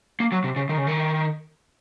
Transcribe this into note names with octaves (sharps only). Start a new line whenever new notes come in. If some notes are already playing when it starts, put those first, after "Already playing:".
A#3
F#3
C3
C#3
D#3
C#3
D#3